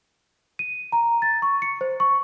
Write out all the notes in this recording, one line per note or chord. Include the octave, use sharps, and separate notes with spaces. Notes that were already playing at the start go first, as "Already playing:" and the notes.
D#7
A#5
A6
C#6
C#7
C5
C#6